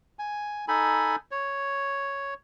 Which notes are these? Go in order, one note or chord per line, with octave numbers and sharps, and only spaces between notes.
G#5
D#4 A4 G#5 B5
C#5